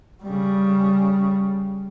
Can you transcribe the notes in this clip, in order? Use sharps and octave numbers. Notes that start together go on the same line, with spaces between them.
C#3 G3